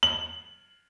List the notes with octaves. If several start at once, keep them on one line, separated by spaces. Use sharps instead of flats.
F#7